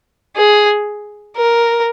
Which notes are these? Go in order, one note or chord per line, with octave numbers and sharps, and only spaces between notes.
G#4
A#4